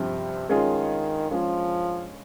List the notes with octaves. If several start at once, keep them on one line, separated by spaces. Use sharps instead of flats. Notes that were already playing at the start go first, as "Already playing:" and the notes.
Already playing: G2 C3 F3 C4
D#3 G#3 C#4 F4 G#4
F3 G#3 C#4 F4 G#4